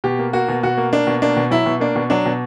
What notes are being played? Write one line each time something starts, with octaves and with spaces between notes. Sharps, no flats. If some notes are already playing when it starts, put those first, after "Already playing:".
B2 G4
A#3
A#3 F#4
B2
B2 F#4
A#3
A#3 D4
B2
A#3 D4
B2
F#3 E4
B2
A#3 D4
B2
F#3 D4
B2